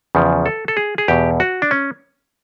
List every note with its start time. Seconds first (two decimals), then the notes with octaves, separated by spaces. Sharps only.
0.15 E2 C#3 F3
0.46 A4
0.68 A4
0.77 G#4
0.98 G#4
1.08 E2 B2 G4
1.40 F#4
1.62 D4
1.71 C#4